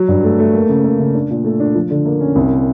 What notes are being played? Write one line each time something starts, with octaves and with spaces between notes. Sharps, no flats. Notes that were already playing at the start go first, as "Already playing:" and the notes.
Already playing: F#3
G2
A3
A3
A#3
C#3
A#3
C#3
D4
A#2
A3
D4
F3
D3
A#3
C#4
C2